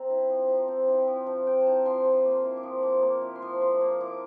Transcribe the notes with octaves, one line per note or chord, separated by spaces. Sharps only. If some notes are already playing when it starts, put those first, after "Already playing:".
Already playing: C4 A#5 C6
E4
F3
F3 A#5
C4
E4 G5
F3
F3
C4 G5
A5
E4 A#5
F3 C6
F3 C6
A#3
C6
E4
D6
F3
F3 D6
A#3
E4
C6
F3
F3 C6
A#3
E4 D6